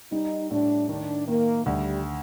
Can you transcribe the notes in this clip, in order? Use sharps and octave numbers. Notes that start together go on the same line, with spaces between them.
G3 D#4
A2 D4
D#3 D4
D#3 A#3
D2 G3